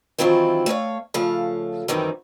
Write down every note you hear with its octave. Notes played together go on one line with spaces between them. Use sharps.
D#3 E3 F#3 C4 E4 F4
A3 C#5 D#5 F5
C#3 F3 A3 F5
F#2 D#3 E3 G3 C4